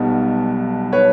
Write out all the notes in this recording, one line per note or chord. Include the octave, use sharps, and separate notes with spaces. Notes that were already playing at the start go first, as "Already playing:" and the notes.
Already playing: B1 B2 G3 B3
B4 C#5